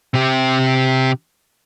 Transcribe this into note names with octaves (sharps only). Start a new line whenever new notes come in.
C3 G4